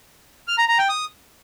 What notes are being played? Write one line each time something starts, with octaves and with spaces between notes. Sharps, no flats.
F6
A#5
A#5
G5
D#6